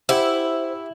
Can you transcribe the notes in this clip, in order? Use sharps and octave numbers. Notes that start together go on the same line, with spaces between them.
E4 G4 C5 E5 F#5